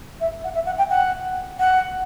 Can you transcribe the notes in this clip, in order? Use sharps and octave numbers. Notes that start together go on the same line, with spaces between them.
E5
F#5
E5
F#5
G5
F#5
F#5